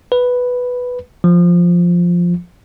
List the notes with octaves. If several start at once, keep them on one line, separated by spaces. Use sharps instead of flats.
B4
F3